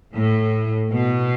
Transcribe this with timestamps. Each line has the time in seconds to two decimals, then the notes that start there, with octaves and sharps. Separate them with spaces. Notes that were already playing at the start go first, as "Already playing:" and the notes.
0.15 A2
0.93 B2